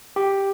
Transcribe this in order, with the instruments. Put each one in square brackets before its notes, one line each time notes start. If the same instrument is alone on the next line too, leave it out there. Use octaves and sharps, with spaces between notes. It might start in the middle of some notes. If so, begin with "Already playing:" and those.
[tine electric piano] G4